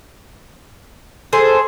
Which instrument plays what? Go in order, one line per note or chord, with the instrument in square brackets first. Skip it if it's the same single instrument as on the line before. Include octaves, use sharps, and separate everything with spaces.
[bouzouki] G#4 C5 [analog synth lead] A4